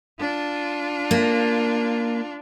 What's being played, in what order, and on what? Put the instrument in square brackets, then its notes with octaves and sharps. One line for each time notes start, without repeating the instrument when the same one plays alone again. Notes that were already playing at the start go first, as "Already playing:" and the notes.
[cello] D4 F4
[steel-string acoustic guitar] A#3